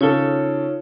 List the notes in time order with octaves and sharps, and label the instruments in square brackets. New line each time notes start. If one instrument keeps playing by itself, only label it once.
[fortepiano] C#3 A4 [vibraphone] D#4 F4 C#5